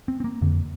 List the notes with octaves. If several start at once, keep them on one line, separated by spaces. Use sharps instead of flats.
C4
C4
A#3
F2 D3